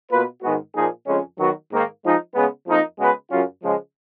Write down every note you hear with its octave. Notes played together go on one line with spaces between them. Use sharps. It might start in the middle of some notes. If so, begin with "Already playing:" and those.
B2 A#3 F4 B4
G#2 D#3 G#3 B3 F#4
A#2 F3 A#3 D#4 G#4
F2 C#3 G#3 C#4
D#3 F#3 B3 F#4
G#2 D#3 A#3
F3 G#3 D#4
C#3 G#3 B3
F2 F3 A#3 D#4
C#3 G#3 B3 F#4 B4
F#2 C#3 F#3 C#4 F4
C#3 F3 G#3